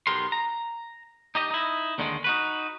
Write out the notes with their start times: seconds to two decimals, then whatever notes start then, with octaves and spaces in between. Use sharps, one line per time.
0.07 B1 B3 G4 A#4 C6
0.32 A#5
1.35 D#4 G4 D#5
1.51 D#4 E4
1.98 D#2 D3 D#3 G#3
2.24 D#4 F#4 B4